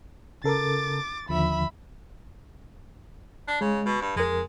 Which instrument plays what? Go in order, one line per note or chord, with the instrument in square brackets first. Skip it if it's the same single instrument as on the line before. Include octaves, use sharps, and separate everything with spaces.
[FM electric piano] C#3 A4 A#4 [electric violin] D6 A6
[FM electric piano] D#2 D3 F3 [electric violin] E5 B5
[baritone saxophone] D4
[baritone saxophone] C#3 [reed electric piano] G#3
[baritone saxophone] B2
G2
[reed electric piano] F2 A#4 [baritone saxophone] G#3